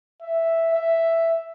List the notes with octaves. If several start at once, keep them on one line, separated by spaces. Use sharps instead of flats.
E5
E5